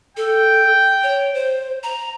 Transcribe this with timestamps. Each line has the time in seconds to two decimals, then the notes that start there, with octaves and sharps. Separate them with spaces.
0.17 A4 G5
1.03 C#5
1.34 C5
1.83 A#5